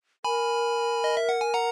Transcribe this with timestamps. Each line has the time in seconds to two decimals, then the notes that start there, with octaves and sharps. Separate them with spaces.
0.24 A#4 G#5 B5
1.04 D#5
1.17 E5
1.29 F#5
1.41 G#5
1.54 F#5 A#5